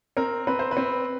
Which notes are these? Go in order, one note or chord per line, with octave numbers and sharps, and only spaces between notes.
C4 A#4
C4 B4
C5
B4
C4